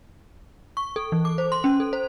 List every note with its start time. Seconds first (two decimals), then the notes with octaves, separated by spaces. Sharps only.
0.77 C#6
0.96 A4
1.12 E3
1.25 D6
1.38 C5
1.52 C6
1.64 C#4
1.80 A4
1.93 C5